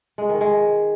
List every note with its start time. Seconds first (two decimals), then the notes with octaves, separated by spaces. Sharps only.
0.18 G#3
0.29 D#3
0.41 G#3